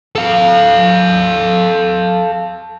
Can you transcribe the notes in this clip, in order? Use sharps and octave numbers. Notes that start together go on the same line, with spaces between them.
A4 F5